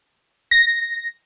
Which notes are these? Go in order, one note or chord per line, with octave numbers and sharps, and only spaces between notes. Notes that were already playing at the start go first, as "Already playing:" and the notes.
A#6